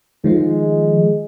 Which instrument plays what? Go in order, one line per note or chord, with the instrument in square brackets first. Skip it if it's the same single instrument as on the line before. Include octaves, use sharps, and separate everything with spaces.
[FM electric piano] D#3 F3 F4 [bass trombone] G#3